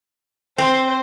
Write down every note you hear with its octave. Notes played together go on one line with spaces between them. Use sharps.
C4 C5